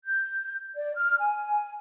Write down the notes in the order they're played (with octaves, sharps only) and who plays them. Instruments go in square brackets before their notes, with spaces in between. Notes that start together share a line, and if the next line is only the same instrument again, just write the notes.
[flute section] G6
D5
F6
G#5